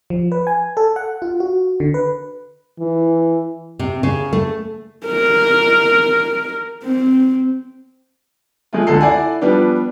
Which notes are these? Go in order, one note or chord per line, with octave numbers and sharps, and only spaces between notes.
F3
B4
G#5
A4
F#5
F4
F#4
D3
B4
E3
C3
C#3
A3
A#4
C4
F3 G#3 A3 F4
C#2 D3 A4 C7
E4 A4 D5 F#5 G#5
F3 G3 B3 D4